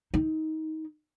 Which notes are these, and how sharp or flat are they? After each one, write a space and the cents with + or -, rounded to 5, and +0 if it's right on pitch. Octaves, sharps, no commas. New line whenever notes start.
D#4 +20